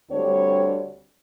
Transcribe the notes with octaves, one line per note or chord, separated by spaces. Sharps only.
D2 G3 C4 D4 C#5